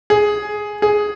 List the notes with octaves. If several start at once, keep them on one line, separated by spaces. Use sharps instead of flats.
G#4
G#4